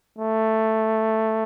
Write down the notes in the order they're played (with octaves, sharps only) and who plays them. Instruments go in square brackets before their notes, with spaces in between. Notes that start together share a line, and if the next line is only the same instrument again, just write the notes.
[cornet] A3